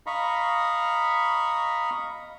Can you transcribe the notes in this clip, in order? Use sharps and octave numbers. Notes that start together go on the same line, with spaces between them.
D#5 F5 A#5 B5 C#6